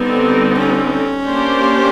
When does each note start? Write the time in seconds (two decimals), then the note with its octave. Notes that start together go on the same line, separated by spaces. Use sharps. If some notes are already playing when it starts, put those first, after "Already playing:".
Already playing: D3 G3 B3 C4 D#4
0.58 C#4
1.26 A#3 D4 G4 C5